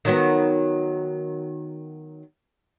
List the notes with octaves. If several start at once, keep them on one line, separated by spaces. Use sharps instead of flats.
D#3 F#3 B3